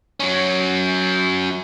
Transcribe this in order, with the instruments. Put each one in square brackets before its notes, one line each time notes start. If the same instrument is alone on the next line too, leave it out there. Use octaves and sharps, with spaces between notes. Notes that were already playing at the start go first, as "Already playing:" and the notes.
[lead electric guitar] F#3 C#4